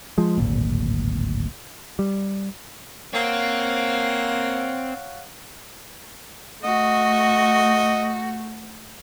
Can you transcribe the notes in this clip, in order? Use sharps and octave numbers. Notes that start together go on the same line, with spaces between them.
F3 G#3
D1 G#1 A#2
G3
A#3 C4 C#5 F5 F#5
A3 F#4 D#5